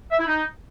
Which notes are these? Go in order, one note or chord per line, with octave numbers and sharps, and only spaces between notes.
E5
E4
D#4